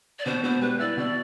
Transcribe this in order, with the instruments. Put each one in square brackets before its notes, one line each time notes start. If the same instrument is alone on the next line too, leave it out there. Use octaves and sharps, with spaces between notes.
[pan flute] D5
[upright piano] B2 [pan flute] C5
[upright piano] B3 [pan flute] C5
[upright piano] G3 [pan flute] B4
[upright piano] E4 [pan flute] D5
[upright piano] B2 [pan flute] D5